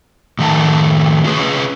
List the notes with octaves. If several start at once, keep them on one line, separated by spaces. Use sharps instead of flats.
A2 D#3 A3 F#5 A5
C#4 F4 G#4 B4